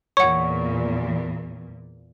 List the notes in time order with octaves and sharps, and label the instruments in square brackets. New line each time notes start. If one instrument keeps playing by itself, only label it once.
[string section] E2 A#2 [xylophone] C#5 F#5 [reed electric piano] C#6